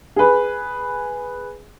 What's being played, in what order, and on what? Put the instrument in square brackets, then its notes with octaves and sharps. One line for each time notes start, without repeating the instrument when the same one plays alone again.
[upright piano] G#4 B4